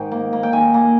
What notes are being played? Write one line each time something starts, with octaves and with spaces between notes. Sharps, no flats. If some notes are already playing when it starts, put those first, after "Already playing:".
Already playing: G#2 D#3 G5
A#3
A#3
G5
D#3 G#5
A#3